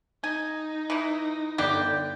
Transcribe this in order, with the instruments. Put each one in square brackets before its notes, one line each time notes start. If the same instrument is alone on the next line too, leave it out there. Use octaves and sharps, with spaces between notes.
[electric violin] D#4 [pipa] G#5
[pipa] E3 E4
[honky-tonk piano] G1 D5 D6 [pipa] F#3 A#3 G4